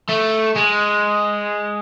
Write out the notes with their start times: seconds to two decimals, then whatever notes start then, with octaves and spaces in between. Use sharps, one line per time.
0.09 A3
0.55 G#3